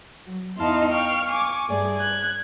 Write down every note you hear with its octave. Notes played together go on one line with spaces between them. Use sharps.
F#3
E2 D#4 E4 F5 A5 C6
F5 G5 C#6 F6
G#5 C#6 D6
G2 A3 G#4 D5 G#5
F#6 G#6